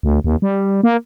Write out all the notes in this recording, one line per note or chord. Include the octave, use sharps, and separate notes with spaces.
D2
D#2
G3
A#3